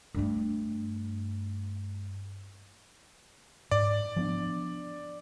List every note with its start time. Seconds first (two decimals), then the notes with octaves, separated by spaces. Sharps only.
0.14 G2 A3
3.71 G#2 D5
4.16 F3 B3 D4